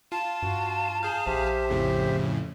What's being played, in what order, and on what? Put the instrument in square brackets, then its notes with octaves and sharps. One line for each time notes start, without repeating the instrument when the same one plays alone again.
[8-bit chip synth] F4 [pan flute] A5
[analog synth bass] G2 [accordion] F#4
[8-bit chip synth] G#4 F5 [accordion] G6
[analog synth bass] A#1 [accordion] G4 C5 E5
[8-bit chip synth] F2 A2 C#3